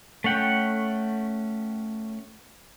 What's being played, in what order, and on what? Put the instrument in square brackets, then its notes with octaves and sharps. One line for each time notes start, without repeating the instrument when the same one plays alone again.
[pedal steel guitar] A3 C#4 F#5 G5